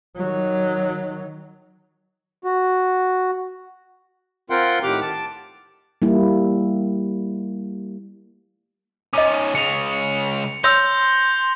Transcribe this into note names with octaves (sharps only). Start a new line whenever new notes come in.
D#3 F#3
F#4
C4 F4 A#4 F#5 G5 C6
A2 D#3 G4 F#5 D6 F6
A5 D6
G3 A#3 E4
C#4 D#4 D#5 D6
C#3 G#3 C#7 F7
C#5 C6 E6 G6 A#6 F7